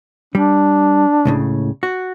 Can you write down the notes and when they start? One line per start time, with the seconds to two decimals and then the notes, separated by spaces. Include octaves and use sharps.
0.35 G3 D4
1.25 C#2 A2 C#3
1.83 F#4